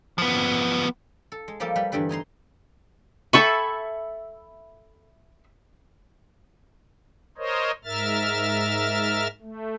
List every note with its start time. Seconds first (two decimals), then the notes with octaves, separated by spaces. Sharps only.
0.18 F3 B3
1.32 A4
1.48 G#3
1.60 F3 G3 A#3 G4 A4
1.76 G3 B4
1.92 E2 G2 D3 G3 B4
2.09 D#4 G#5 A#5 C6
3.33 A4 E5 G5 G#5 B5 C#6
7.38 A#4 C5 C#5 D#5
7.84 G#2 A#4 E5 F6 A6
9.42 A3